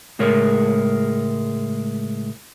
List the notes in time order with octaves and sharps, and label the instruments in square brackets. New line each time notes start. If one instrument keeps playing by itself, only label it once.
[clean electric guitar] C#2 A2 G#3 A#4 C#5